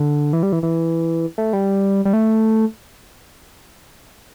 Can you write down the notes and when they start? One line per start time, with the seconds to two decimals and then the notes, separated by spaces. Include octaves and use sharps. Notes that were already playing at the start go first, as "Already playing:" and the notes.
Already playing: D3
0.33 E3
0.43 G3
0.52 E3
0.63 E3
1.38 A3
1.53 G3
2.05 G3
2.13 A3